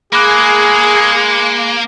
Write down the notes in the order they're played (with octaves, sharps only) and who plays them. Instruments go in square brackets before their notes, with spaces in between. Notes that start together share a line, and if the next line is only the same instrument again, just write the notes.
[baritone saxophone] G#3 [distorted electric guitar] A#3 [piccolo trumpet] G#4 [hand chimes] B5 D6 F#6